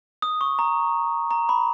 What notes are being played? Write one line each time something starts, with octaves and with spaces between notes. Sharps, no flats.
D#6
C#6
A#5
A#5
B5